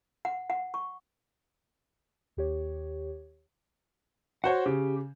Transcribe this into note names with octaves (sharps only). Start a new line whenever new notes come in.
F#5
F#5
C#6
D#2 G4 C#5
F#4 C5 C#5 F#5
C#3 G4